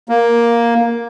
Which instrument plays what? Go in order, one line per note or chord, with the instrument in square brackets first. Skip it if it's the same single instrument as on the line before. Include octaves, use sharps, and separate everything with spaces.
[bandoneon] A#3